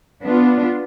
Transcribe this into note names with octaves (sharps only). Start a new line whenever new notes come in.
B3 D4 F4